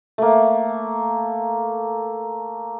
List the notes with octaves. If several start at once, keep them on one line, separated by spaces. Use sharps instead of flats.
A3 A#3